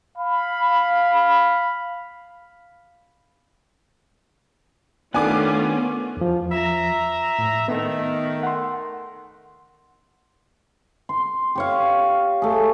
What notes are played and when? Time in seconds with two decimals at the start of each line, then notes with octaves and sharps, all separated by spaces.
0.18 F5 B5
5.14 D#3 A3 B3 C#4 D4 F4 G#5 D6
6.17 E2 F3
6.52 E5 A#5
7.39 A2
7.68 D#3 A3 B3
8.43 F#5 C6
11.09 C6
11.55 G4 C#5 F5
12.42 A3 G#4